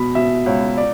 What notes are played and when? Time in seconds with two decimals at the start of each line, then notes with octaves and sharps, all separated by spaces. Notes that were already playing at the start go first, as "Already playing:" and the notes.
Already playing: B2 B5
0.15 B2 E5
0.46 C#2 C#5
0.77 D5